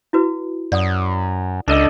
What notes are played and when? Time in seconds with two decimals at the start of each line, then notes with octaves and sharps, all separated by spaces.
0.13 E4 F#4 B4
0.72 F#2 D5 F#5 D#6
1.68 C#2 D4 A4 D#5